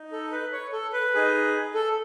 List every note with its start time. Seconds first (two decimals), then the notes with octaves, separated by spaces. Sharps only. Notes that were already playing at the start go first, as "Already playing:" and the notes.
Already playing: D#4
0.12 A4
0.32 B4
0.52 C#5
0.72 A4
0.93 B4
1.14 D#4 G#4
1.74 A4